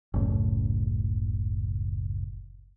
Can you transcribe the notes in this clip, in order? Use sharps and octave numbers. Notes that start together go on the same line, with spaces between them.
F#1 C#2 A2